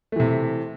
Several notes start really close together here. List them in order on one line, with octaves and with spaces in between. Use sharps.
A3 E3 C3